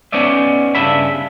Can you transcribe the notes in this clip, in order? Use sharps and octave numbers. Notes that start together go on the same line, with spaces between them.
B3 C#4 D#4 D5 E5
G2 C#3 D4 E5 B5